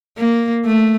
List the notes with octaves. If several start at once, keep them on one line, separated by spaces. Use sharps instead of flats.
A#3
A3